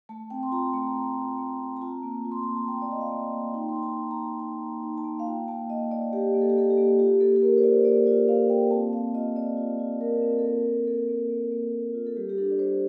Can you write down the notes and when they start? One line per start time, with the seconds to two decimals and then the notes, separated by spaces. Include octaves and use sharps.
0.09 A3 A5
0.30 C4 G5
0.43 C6
0.52 F4 A#5
0.73 A3 A#5
0.95 A3
1.17 F4
1.38 A3
1.60 C4
1.76 A#5
1.81 F4 A5
2.03 A#3
2.25 F4
2.32 C6
2.43 A#3 A#5
2.56 A5
2.67 A#3 G5
2.82 D5
2.89 F4 D#5
3.01 F5
3.11 A#3 G5
3.32 A#3
3.54 D#4 G5
3.69 C6
3.75 D#4 A#5
3.83 A5
3.97 D#4
4.11 A#5
4.19 D#4
4.39 D#4 A#5
4.61 A#3
4.83 D#4
4.98 A5
5.05 A#3
5.20 F5
5.26 F4 G5
5.48 A#3 A5
5.69 A#3 D#5
5.91 A#3 D5
6.13 A#3 G4
6.34 A#3
6.42 A4
6.50 G4
6.56 A#3 A4
6.70 G4
6.77 A#3
6.99 F4 G4
7.20 A#3 A4
7.36 A4
7.42 A#3 A#4
7.58 C5
7.63 F4 D5
7.85 A#3 D5
8.06 F4 D5
8.28 A#3 F5
8.49 A#3 G5
8.71 C4 A5
8.93 C4 F5
9.14 F4 D#5
9.36 C4 D5
9.57 F4
9.79 F4
10.01 F4 A#4
10.22 C4
10.39 A4
10.44 A#3 A#4
10.65 A#3
10.87 A#3 A4
11.08 A#3
11.30 A#3
11.51 A#3
11.73 A#3
11.95 F4
12.06 A4
12.16 G3 G4
12.29 G4
12.38 D4 A4
12.51 D5
12.59 G3 C5